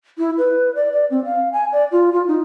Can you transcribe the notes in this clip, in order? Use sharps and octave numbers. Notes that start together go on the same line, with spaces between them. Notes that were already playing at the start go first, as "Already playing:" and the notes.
E4
B4
D5
D5
C4
F5
G#5
D5
F4
F4
D#4